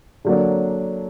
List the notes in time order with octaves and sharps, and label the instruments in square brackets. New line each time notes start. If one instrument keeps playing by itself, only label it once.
[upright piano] D3 F#3 A#3 D4